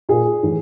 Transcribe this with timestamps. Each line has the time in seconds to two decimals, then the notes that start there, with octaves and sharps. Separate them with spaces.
0.09 A#2 G#4
0.43 A2 E3